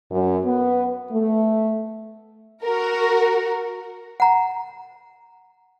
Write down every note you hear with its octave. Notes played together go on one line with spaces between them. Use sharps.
F#2
B3
A3
F#4 A#4
F#5 A#5